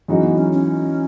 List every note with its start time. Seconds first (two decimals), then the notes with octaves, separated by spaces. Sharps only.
0.08 F#2 E3 G#3 C#4 D#4 F#4
0.23 B3
0.38 C#4
0.53 C#4